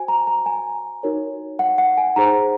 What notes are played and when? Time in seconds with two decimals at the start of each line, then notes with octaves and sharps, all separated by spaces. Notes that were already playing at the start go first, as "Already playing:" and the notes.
Already playing: F#4 C5 G#5
0.08 A#5
0.27 A#5
0.46 G#5
1.03 D#4 F#4 A#4 C#5
1.59 F#5
1.78 F#5
1.98 G#5
2.16 D#4 G#4 C5 A#5